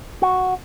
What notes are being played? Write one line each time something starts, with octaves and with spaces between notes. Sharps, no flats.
F#4